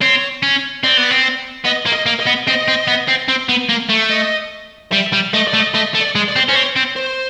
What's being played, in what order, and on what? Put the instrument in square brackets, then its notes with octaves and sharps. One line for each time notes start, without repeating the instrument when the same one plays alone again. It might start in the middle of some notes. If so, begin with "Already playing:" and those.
[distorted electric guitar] C4 [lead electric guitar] C#5
[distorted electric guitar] C#4
[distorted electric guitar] C4 [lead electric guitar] D5
[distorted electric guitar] B3
C4
[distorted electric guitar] B3 [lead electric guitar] D#5
[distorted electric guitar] A#3
[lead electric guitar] D#5
[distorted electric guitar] A#3
[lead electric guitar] D#5
[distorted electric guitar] B3
[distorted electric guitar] C4 [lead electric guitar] D#5
[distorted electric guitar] C4
B3
C4
C4
B3
A#3
A3
[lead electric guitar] D#5
[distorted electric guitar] G3 [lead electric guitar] E5
[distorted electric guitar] G3
[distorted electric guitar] A3 [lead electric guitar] D#5
[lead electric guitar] D5
[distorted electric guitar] A3
[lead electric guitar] D#5
[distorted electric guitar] A3 [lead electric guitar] D#5
[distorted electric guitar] A3
[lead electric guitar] D5
[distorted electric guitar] G#3
[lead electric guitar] D5
[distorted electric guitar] C4
[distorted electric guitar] C#4 [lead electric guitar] C5
[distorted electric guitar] C4 [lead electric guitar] C#5
[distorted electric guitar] C4
[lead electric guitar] C5